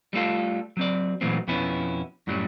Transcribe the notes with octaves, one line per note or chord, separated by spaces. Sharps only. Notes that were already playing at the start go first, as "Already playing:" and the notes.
G3 A3 B3 F4 A4
F#3 C4 D5
A#2 E3 F#3 A3 B3 C4
F2 B2 B3 C#4 E4
F#2 A2 F#3 G3